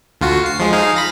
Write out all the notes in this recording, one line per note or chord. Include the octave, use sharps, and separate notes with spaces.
D2 F4 F#4
C7
F3 G#3
D#4 G#4 F5
B5 A#6